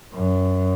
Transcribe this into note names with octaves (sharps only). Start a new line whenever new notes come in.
F#2